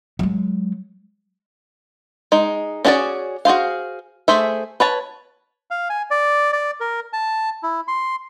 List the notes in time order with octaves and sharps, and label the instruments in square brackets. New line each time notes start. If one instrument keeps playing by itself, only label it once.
[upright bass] F#3 G#3
[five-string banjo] G#3 D#4
C#4 D4 F#4 G#4 D5
F#4 G#4 C5 F5
A3 G#4 C5 E5
B4 C#5 A5
[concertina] F5
G#5
D5
D5
A#4
A5
E4
C6